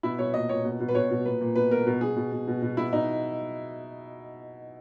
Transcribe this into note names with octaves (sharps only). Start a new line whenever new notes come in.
B2 E4
B2 C#5
A#2 D#5
A#2 C#5
B2
B2
B4
B2 C#5
B2
A#2 B4
A#2
B2 B4
B2 A#4
B2
B2 G#4
B2
B2
B2
B2
B2 E4
B2 D#4